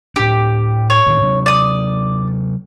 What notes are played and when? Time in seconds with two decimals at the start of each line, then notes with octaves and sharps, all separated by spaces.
0.16 A2 D4 G4
0.90 C#5
1.07 D2 A2 D#3
1.22 C3 F#3 D4
1.46 D5 D#6